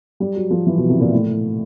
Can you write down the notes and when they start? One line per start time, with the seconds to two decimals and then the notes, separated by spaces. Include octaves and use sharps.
0.20 G3
0.36 F#3
0.51 F3
0.66 E3
0.78 B2
0.89 C3
1.00 A#2
1.12 A2